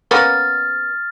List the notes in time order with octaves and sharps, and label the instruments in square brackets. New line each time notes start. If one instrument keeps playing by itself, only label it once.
[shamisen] A#3 B3 C#4 [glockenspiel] F6 A6